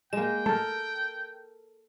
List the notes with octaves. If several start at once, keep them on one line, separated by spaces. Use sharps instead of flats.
G#3 A#3 G5 E7
A3 A4 A#4